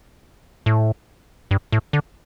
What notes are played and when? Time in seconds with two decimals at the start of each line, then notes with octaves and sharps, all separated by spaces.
0.66 A2
1.51 G2
1.72 A2
1.93 D3